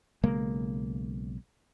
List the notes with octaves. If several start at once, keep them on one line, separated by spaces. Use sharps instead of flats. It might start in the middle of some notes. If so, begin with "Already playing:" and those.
B1 C#3 G#3 A#3